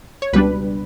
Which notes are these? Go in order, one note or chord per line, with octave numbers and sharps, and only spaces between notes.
C#5
C#2 B2 G3 D4 B4